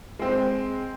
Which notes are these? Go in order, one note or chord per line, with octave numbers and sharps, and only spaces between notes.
G#3 C4